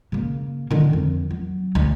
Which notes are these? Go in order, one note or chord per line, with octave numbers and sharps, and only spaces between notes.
C#3 A#3
D3 D#3
F2
F#3
D2